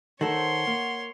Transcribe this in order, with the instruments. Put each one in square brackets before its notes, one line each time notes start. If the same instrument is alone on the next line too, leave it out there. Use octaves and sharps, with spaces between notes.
[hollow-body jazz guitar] D#3 A4 C5 [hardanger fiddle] C#5 C6 [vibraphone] F#5
[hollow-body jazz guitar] A#3